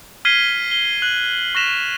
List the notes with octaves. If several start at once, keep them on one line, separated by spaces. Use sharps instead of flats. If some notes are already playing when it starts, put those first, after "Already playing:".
F6 G#6 B6 C7 D#7 G7
G7
F#6 F#7
C#6 F#6 A#6 B6 E7 F7